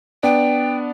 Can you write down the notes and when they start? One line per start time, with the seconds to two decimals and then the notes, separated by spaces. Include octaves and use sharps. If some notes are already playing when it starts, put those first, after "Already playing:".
0.23 B3 D4 D5 G5